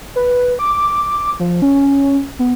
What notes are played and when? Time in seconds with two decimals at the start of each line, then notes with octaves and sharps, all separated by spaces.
0.16 B4
0.59 D6
1.40 F3
1.62 C#4
2.39 B3